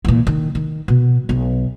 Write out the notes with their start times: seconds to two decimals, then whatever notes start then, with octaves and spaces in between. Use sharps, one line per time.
0.05 A#2 E3
0.27 D#3
0.55 D#3
0.88 B2
1.29 B1